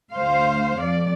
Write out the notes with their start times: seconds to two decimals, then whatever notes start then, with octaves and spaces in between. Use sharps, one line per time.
0.13 D2 C5 F5
0.79 F2 D5